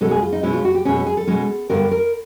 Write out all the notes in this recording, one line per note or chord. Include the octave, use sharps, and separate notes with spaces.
B2 G#3 C#4 A4
G#4
F4
D#4
B2 G#3 C#4 E4
F4
F#4
G4
B2 G#3 C#4 G#4
A4
G#4
A4
B2 G#3 C#4
G2 D3 G3 B3 A#4
A#4